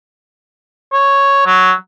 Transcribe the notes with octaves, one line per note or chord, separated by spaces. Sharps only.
C#5
F#3